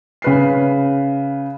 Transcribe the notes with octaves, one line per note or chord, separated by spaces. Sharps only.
C#3 B4 C7